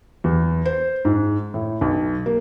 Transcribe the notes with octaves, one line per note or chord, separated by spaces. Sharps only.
E2
C5
G#2
A2
B1
A#3